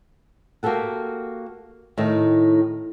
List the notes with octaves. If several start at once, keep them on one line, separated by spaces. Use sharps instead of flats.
A#3 F#4 G4 A4 F#5
A2 D#3 D#4